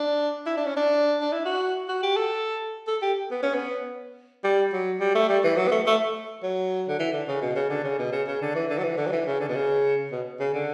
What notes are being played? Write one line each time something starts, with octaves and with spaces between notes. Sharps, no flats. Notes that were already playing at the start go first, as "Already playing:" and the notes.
Already playing: D4
E4
D4
C#4
D4
D4
E4
F#4
F#4
G4
A4
A4
G4
B3
C#4
B3
G3
F#3
G3
A3
G3
E3
F#3
B3
A3
A3
F#3
D3
E3
D3
C#3
B2
C#3
D3
C#3
B2
C#3
C#3
D3
E3
D3
F#3
E3
D3
F#3
E3
C#3
D3
B2
C#3
B2
C#3
D3